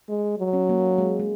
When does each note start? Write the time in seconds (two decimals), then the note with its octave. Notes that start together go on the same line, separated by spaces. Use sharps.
0.09 G#3
0.38 F#3
0.53 C#4
0.69 A#3
0.98 G#3
1.20 G#3